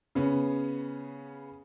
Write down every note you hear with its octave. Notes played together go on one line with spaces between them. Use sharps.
C#3 B3 C#4